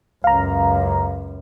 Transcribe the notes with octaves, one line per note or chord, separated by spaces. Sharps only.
C#2 F#2 F5 A#5